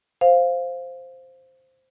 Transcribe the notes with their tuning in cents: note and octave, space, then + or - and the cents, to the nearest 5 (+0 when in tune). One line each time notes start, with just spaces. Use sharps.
C5 +0 F5 +0